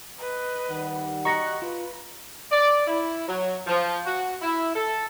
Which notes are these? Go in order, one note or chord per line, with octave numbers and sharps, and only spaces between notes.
B4 D#5
D#3 G3 F#5
F#4 G4 D#5 A#5 C#6 F#6 A#6 C#7
F4 B4
D5
E4
F#3
F3
F#4
E4
A4